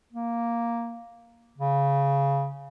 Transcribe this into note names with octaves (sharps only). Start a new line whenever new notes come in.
A#3
C#3